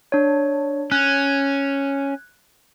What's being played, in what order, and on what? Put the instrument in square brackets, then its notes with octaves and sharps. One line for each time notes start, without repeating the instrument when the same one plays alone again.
[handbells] D4 C#5
[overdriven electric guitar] C#4 [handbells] F#6 G#6